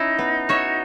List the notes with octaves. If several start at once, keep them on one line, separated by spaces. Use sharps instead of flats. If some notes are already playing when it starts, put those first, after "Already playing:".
Already playing: C#4 D#4 E4
B3
F#4 C#5 E5